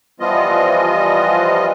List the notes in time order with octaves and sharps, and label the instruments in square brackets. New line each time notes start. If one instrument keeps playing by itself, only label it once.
[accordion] E3 F3 G3 B3 F4 D#5